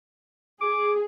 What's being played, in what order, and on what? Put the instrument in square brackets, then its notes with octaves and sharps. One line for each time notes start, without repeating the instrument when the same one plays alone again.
[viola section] G#4 [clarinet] D6